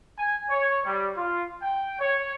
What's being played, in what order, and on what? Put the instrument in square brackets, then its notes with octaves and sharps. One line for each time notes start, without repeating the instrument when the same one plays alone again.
[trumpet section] G#5
C#5
G3
F4
G5
C#5